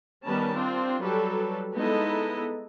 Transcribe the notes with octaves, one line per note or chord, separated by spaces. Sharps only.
D#3 G3 B3 C#4 B4 A5
C4 D4 F4
F#3 G3 A4 B4
G#3 B3 D#4 E4 A4 D#5